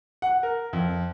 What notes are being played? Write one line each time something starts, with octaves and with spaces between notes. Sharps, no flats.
F#5
A#4
F2